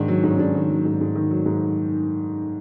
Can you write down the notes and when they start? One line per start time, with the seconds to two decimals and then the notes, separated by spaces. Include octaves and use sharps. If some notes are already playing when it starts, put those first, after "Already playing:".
Already playing: G#2 D#3 D4
0.08 F#3
0.24 G#2
0.31 C#4
0.39 G#2 D4
0.55 D#3
0.69 F#3
0.85 G#2
1.01 G#2
1.15 D#3
1.31 F#3
1.46 G#2